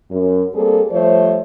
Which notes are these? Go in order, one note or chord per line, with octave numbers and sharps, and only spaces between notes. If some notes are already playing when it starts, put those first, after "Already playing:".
F#2
G3 A#3 C4 G#4 A4
F3 G3 A3 C5 C#5